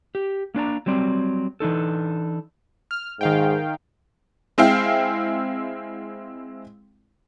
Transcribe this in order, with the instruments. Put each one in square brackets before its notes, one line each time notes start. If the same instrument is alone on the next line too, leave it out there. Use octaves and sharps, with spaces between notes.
[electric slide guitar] G4
A#3 D4 D5 A#5
F#3 G3 C4 D5
E3 D4 D#4 A4
[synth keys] F6
[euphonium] G#2 [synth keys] D#3 F5 G5
[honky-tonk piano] G#3 C4 E4 F5 G5